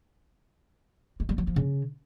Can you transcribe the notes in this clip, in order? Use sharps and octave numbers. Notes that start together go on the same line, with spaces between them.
G#3
G3
F#3
F3
C#3